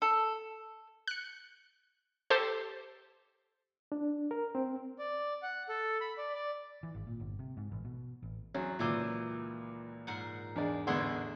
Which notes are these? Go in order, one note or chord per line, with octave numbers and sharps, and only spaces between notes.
A4
F#6 C#7
G4 A4 C5
D4
A#4
C4
D5
F#5
A4
B5
D5
D5
E3
G#1
A#2
G1
C3
G#2
A1
B2
A1
E2 F#3 C#4 G#5
C#2 A#2 D#3 E3 C6 D6 E6
G#2 A#4 F#5
E2 D4 G#4 D5
A1 D3 B3 E4 G#4 F#5 C6 E6